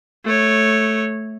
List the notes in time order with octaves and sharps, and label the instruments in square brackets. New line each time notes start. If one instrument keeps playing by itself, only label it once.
[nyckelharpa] A3 C#5